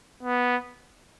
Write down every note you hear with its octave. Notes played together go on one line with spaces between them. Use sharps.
B3